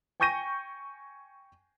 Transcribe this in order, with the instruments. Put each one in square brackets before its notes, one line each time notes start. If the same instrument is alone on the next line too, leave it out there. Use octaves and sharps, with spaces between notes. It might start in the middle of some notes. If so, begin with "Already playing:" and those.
[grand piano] G5 G#5 C#6 G6 A#6 D#7